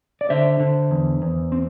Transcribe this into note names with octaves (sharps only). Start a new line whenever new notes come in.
D5
D3 C5 E5
D3
E2
E2
C4